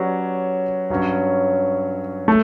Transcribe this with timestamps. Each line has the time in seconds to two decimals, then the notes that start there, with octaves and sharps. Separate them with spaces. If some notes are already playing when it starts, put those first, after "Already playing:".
Already playing: F#3 C#4 G4 B4 D5
0.90 G2 F#3 C#4
2.28 A3